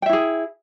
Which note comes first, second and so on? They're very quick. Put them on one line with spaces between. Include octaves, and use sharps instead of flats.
G5 E5 E4 G#4